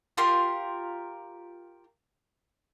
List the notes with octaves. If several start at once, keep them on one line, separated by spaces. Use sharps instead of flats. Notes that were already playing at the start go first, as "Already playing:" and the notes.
F4 G4 A#4 C6